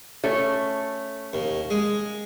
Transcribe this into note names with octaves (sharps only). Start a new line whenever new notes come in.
A3 C#4
D#2
G#3